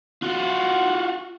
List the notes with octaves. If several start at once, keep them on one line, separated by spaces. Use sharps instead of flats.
F4 F#4